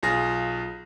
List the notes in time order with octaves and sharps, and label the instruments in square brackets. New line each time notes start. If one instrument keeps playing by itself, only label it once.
[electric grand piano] B1 F4 G#4 A#6